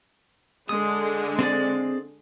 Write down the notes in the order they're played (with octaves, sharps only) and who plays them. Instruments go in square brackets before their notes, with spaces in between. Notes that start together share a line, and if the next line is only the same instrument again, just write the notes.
[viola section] D3 G#3 [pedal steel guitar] D#6
[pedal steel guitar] C4 G#4 D5